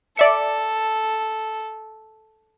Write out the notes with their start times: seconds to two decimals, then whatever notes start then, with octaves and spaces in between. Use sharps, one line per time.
0.17 A4 D5 E5 C#7